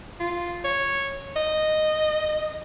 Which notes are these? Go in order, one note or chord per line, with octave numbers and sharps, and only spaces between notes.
F4
C#5
D#5